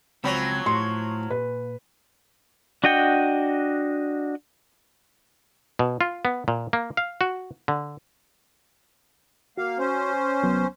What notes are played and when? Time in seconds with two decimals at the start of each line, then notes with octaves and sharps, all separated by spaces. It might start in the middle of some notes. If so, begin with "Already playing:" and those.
0.24 C#2 F3 F#3 C4 B5
0.66 A2 C6
1.30 A#2 B4
2.84 D4 F#4 D#5 F#5 G5
5.79 B2
6.01 F4
6.25 B3
6.48 A#2
6.73 A#3
6.97 F5
7.21 F#4
7.68 D3
9.58 A#3 F#4 F5
9.79 C#4 C5
10.43 C2 F#3 B3